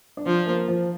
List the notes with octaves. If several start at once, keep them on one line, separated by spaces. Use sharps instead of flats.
D4
F3 C4
A#3
F3